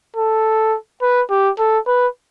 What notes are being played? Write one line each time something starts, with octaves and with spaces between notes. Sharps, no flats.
A4
B4
G4
A4
B4